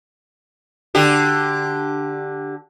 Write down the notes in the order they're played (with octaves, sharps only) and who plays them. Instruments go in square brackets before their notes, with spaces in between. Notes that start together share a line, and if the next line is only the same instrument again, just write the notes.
[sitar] D3 G4